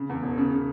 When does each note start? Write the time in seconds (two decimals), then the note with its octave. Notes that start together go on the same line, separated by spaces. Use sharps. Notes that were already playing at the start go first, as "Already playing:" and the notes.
Already playing: C#3
0.09 E2
0.23 E1
0.38 C#3
0.52 C#3